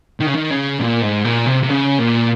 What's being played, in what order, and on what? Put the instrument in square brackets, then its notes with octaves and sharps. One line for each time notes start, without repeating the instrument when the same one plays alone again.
[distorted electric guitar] D#3
C#3
D#3
C#3
A#2
G#2
A#2
C3
C3
C#3
A#2